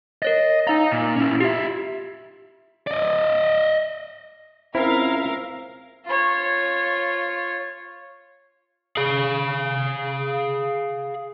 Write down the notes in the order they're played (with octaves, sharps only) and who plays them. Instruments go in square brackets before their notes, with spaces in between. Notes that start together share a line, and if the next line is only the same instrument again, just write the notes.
[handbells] A#4 C#5 A6 [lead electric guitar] D#5
[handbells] D#4 F5 [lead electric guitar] D#5 A#5
[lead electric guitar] A#2
C#4 E4
[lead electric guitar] F4 E5 [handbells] G4
[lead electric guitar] D5 D#5
[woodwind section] C#2 C#4 E5 [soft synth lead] C4 [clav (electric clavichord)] E4 [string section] A#4 F5
[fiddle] F4 C#5
[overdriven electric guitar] G#4 F5